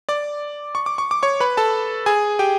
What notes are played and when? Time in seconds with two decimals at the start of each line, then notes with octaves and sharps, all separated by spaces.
0.09 D5 D6
0.75 C#6
0.86 D6
0.98 C#6
1.11 D6
1.23 C#5 C#6
1.40 B4 B5
1.57 A4 A5
2.06 G#4 G#5
2.39 G4 G5